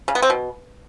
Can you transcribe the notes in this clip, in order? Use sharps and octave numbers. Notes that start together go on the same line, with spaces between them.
C#3
B3
C4
B2